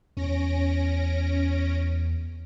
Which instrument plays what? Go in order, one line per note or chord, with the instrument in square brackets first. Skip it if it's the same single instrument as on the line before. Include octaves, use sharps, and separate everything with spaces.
[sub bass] E2 [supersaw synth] C#4 A#6 D7